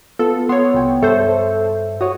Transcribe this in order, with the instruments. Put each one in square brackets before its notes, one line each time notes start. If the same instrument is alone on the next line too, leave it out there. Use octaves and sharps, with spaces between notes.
[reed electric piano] B3 F4 [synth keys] A4
[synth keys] B3 C#5 [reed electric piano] C6
[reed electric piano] C2 G5
[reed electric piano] G2 C#5 E5 [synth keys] A4 C5
[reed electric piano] F#4 C#5 [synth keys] D#6